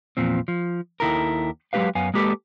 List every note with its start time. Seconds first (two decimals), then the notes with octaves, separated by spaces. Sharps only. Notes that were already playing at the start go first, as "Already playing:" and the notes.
0.17 E2 A#2 F3 C4
0.48 F3
1.00 D#2 D#3 E4 A4 A#4
1.73 F#3 G#3 A#3 G4 B4 F5
1.95 F#2 B3 F5 G#5
2.14 G#3 A#3 G4 A4 B4